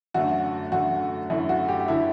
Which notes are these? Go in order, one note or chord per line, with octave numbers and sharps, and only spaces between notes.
F#2 D3 A3 F#4
F#2 D3 A3 F#4
F#2 D3 A3 E4
F#4
G4
D3 A3 E4